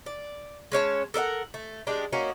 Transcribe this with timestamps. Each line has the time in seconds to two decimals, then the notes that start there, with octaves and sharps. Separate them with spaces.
0.06 D5
0.72 G#3 C#4 C#5 A5
1.14 A4 A#4 D#5 F#5
1.54 A3
1.87 G#3 D4 G4
2.12 A#3 C#4 D#4 F#4